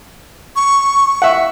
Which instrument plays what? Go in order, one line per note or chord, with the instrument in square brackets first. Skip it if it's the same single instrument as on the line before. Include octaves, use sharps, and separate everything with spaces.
[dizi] C#6
[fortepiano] E5 F#5